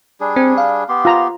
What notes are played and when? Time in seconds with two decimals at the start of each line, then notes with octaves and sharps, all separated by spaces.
0.21 G3 D4 G#4
0.36 C4
0.58 F5
0.89 B3 G4 C6
1.05 F4 A#5